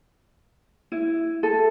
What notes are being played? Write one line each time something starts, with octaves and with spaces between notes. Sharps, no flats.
E4
A4